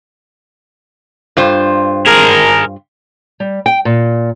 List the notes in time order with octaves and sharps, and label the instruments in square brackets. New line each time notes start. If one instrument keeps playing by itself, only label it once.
[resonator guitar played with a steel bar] G2 F4 C5
[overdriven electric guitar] G#4 A#4
[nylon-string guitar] G3
G5
A#2